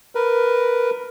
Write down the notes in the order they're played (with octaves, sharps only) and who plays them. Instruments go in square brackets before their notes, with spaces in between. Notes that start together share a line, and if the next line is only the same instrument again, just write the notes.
[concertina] A#4 B4